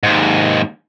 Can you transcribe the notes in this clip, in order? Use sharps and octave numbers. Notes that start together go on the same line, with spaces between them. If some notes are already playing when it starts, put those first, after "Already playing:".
D#2 G#2